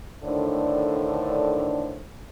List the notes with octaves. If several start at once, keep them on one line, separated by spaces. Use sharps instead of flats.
A2 D3 D#3 D4 C5 D5